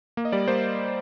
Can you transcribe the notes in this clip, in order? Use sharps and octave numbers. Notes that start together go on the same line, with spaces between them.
A#3
D#5
G3 D5
A#3 C5